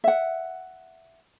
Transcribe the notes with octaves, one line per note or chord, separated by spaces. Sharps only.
E5 F#5